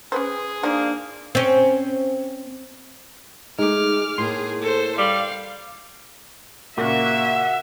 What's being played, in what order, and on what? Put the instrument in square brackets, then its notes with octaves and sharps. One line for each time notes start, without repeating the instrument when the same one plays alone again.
[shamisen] C#4 B4 C5 [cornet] G#4
[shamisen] F3 D#4 [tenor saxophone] A#3 [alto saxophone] D4
[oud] C4 C#4
[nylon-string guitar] G#3 A3 [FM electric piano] D#4 [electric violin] D6 F6
[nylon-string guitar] A2 A#3 [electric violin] G#4 [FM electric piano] C6
[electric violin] A4 C5
[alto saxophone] G3 [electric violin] F5
[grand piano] A#2 C#3 [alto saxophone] A#3 [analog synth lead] F#4 [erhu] E5